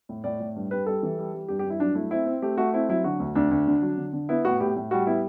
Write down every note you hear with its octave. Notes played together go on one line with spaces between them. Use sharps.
A2
A2 D5
A2
G2
G3 B4
G3 A4
E3
G3
G3
G2 G4
G4
G2
E4
F#3 D4
A3 E4
C4 E4
C4
A3 G4
A3 F#4
C4 E4
F#3 E4
D3 F#4
D2
D2 D4
D2
D3
F#3
D3
D3
B3 E4
A2 F#4
A2 G4
A2
G3 F#4
B3 E4